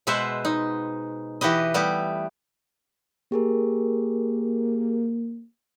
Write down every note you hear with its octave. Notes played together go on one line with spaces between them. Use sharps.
B2 G#3 B4 C5 E5 F#5
D#4
E3 F#4 G4 B4 D#5
G3 A3 B3 G4
A#3 G4 G#4 A#4